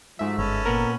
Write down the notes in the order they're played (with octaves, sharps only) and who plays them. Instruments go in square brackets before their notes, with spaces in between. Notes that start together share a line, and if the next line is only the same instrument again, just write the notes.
[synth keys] G#2 E5 [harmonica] F3 F#3 A3
[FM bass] G1 [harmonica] C#4 A4 B4
[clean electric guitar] A#2 B3 A#5 [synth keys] A#4